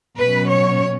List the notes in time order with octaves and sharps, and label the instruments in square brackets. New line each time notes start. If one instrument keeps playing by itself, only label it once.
[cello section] B2 F#3 C#4 B4
C#5